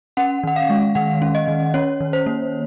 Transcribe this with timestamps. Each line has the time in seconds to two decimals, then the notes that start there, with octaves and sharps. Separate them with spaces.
0.17 C#4 F#5
0.43 D#3 F#5
0.56 F5
0.70 G#3
0.95 D#3 F#5
1.22 C#4
1.35 D#5
1.48 D#3
1.74 C#4 C#5
2.01 D#3
2.13 C5
2.26 A#3